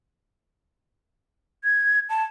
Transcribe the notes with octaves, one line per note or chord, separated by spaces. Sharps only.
G#6
A5